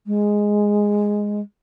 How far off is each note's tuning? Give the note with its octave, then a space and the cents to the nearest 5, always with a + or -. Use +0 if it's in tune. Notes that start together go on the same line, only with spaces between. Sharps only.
G#3 -5